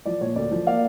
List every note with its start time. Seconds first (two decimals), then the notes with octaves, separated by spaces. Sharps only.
0.06 F3 D5
0.21 A#2 C#5
0.36 D2 D5
0.51 F3
0.67 A#3 D5 F5